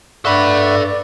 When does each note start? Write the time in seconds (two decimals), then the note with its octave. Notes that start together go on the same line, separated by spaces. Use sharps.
0.25 G2 A4 D5 E5 F#5 B5 C#6